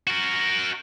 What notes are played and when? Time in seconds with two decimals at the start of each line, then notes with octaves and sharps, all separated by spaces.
0.07 F#4 A#4